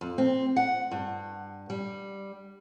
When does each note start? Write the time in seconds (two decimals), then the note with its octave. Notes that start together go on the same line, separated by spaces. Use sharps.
0.01 F2
0.18 C4
0.56 F#5
0.91 G2
1.70 G3